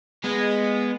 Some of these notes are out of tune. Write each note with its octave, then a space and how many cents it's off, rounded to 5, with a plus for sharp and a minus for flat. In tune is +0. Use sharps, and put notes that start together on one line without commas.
G#3 -10 B3 +0